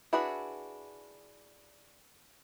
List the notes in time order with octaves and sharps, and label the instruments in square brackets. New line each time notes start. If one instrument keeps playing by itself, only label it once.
[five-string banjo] D4 E4 F#4 G#4 B4